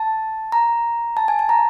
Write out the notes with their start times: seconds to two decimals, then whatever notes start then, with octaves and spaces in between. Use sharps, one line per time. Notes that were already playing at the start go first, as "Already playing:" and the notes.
Already playing: A5
0.52 A#5
1.17 A5
1.28 G#5
1.39 A5
1.49 A#5